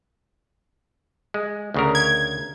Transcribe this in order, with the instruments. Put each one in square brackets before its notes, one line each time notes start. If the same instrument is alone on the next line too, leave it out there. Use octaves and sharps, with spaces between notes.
[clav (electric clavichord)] G#3
D2 C#3 A#4
[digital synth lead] G#6